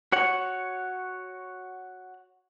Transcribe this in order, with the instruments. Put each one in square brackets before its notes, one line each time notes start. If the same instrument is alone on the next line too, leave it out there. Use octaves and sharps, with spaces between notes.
[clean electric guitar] F#4 C#5 F#5